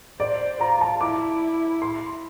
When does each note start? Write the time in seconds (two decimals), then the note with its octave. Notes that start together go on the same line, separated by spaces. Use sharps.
0.20 C5 D5
0.61 F4 A#5
0.81 A5
1.01 E4 D6
1.82 C6